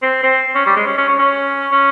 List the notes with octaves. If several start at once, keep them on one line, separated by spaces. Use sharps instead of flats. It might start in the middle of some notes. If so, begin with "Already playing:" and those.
C4
C4
C#4
G3
G#3
C#4
C#4
C#4
C#4
C#4